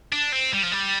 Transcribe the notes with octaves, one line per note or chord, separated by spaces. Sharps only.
D4
C4
G3
F3
G3